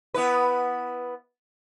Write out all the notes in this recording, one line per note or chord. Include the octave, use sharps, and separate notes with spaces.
B3 E4 B4